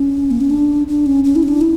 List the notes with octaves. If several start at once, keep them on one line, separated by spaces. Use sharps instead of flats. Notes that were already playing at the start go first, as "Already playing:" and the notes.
Already playing: C#4
A#3
C#4
D4
D4
C#4
C#4
E4
C#4
D4
E4